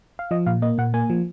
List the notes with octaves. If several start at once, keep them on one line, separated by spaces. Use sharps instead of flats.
F5
F3 D#5
A#2 F5
A#3 D#5
A#2 F#5
A#3 G#5
F3